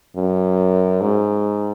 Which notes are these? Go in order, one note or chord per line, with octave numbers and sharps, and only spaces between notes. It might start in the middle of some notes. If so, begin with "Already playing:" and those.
F#2
G#2